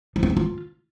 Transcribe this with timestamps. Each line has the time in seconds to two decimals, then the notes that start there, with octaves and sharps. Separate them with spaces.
0.16 F3
0.23 C4
0.30 D4
0.37 F4